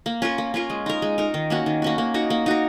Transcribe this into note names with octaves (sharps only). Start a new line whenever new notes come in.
A#3
C#4 F4 A#4
A#3
C#4 F4 A#4
G#3
D#4 A#4
G#3
D#4 A#4
D#3
A#3 C#4 F#4
D#3
A#3 C#4 F#4
A#3
D#4 F#4 A#4
A#3
D#4 F#4 A#4